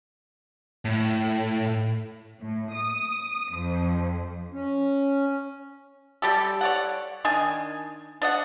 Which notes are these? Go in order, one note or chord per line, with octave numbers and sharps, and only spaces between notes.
A2
A2
D#6
F2
C#4
G3 G4 A4
C#5 D5 F#5
D#3 D4 D#5 G#5
D4 D#5 F#5